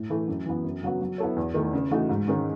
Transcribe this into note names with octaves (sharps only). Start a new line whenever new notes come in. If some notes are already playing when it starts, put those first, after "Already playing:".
Already playing: A2
E3 A3 E4
F#2
E3 B3
F#2
C#3 F#3 B3 F#4
F#3
B3 E4 A4 C#5
E2
D#3 A3 E4
C#3
E3 A3 D#4 F#4
G#2
D#3 G#3 C#4